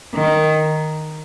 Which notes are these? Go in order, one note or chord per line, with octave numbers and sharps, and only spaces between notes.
D#3